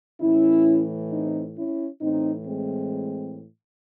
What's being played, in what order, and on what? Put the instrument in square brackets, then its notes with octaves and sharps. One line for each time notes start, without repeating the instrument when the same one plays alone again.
[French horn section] A2 E3 C#4 E4
C4 D#4
C#4 E4
A2 E3 C4 D#4
G#3 C4